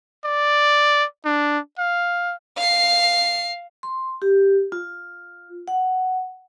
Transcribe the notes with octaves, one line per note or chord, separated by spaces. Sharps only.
D5
D4
F5
F5 C7
C6
G4
F4
F#5